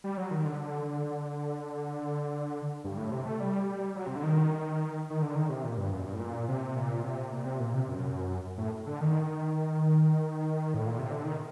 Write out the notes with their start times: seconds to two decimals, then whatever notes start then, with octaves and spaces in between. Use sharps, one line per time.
0.04 G3
0.17 F#3
0.31 D#3
0.45 D3
0.60 D3
2.84 G2
2.97 A2
3.12 C3
3.26 A3
3.40 G3
3.96 F#3
4.07 C3
4.15 D3
4.23 D#3
5.10 D#3
5.22 D3
5.35 D#3
5.49 C3
5.64 A#2
5.77 G2
5.92 F#2
6.06 G2
6.14 A2
6.20 A#2
6.48 C3
6.76 A#2
7.04 C3
7.32 A#2
7.45 C3
7.60 A#2
7.74 C3
7.89 F#2
8.58 A2
8.86 D3
9.01 D#3
10.74 A2
10.87 A#2
10.99 C3
11.11 D3
11.25 D#3